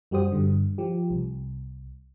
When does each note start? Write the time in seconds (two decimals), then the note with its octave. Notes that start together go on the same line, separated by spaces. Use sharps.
0.11 F#2 G3 F#4 G4 C5 D#6
0.32 G2 D3
0.78 F3 G4
1.10 C2